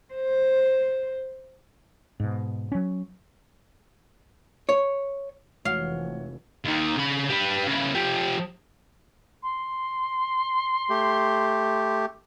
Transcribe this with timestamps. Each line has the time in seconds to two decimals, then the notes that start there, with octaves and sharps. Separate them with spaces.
0.14 C5
2.20 G#2 B2
2.72 F#3 C#4
4.69 C#5
5.65 F1 E3 G#3 A3 F#4 C#5 F5 F#5
6.65 D#2 D#3
6.97 C#3 B5
7.29 G3 B4
7.67 C#3 E4
7.95 F3 G4
9.42 C6
10.89 A3 G4